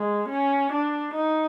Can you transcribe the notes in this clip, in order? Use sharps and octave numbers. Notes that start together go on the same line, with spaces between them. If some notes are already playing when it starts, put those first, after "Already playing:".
Already playing: G#3
C#4
D4
D#4